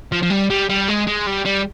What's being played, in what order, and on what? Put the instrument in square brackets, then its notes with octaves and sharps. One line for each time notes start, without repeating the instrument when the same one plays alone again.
[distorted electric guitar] F3
F3
G3
G3
G3
G#3
G#3
G3
G3